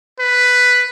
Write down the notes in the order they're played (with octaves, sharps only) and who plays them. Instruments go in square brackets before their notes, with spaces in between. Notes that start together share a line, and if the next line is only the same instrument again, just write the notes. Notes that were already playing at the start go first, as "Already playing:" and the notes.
[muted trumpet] B4